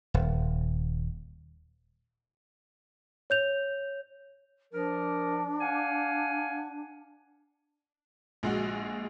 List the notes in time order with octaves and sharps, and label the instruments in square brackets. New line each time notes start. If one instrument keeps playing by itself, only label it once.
[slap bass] D#1
[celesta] C#5 G6 F7
[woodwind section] F3 A#4 [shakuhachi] D4
[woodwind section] F5 F#5 G#5
[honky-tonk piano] A#1 G#3 F#4